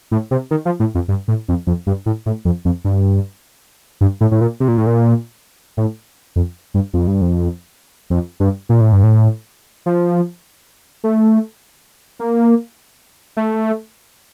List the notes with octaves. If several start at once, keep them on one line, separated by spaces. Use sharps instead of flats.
A2
C3
D#3
F3
A2
F2
G2
A2
F2
F2
G2
A2
A2
F2
F2
G2
G2
A2
A2
A#2
C3
A#2
A2
A#2
A2
F2
G2
F2
G2
F2
F2
G2
A#2
A2
G2
A2
F3
A3
A#3
A3